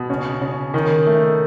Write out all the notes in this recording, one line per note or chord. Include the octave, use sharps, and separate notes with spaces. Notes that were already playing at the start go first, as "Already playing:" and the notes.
Already playing: B2
C#3
C#3
D#3
A3